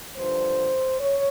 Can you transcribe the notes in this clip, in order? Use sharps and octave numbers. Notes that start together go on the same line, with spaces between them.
G2 D3 F3 C5
C#5